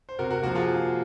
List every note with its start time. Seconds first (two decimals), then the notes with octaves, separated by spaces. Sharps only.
0.09 C5
0.19 C3 F#4 A#4
0.31 F#4 A#4
0.43 F3 A#3 F#4
0.55 F4 G#4